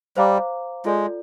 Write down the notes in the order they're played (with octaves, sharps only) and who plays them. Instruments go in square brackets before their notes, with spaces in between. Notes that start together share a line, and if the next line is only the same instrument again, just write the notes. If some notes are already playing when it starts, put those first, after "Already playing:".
[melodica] G3 [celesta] C5 F5 A#5 D6
[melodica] G#3 [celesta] F4 A4 D5